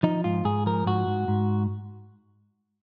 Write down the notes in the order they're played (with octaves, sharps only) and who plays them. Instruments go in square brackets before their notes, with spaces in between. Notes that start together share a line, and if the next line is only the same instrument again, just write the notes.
[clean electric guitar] F3 D#4
G#2 F4
G#2 G#4
F3 A#4
G#2 F#4
G#2
G#2